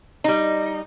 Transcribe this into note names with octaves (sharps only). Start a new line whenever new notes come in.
G3 D#4